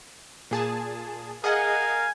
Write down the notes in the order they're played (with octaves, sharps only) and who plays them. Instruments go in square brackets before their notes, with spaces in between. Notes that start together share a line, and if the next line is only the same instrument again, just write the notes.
[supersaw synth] A#2 G#4 A5
[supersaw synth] G#4 D#5 F#5 [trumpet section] A#4 F5 G#5